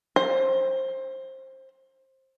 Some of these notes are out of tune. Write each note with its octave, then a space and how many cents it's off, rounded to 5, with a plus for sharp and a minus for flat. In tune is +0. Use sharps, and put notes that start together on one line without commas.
C5 +20